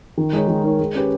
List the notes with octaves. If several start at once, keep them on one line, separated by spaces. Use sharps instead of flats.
D#3
G#3 D#4 A#4 C#5
D#3
G#3 D#4 A#4 C#5
G#3
C#4 G4 B4